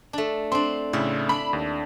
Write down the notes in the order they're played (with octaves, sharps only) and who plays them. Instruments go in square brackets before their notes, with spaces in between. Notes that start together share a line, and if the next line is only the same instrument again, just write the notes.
[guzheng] A3 D4
[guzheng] C4 D4 [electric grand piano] C6
[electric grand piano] A2 C#3 [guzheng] E4
[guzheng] D4 [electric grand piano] B5
[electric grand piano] D#2